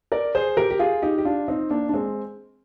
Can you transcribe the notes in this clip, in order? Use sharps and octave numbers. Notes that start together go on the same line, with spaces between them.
A#4 D5
G#4 C5
G4 A#4
G4
F4 G#4
D#4 G4
G4
D4 F4
C4 D#4
A#3 D4
D4
G#3 C4